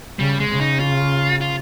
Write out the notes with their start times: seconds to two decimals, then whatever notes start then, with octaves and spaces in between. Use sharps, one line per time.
0.18 C#3 G3
0.40 G#3
0.50 C#3
0.60 D#4
0.80 F4
1.41 F4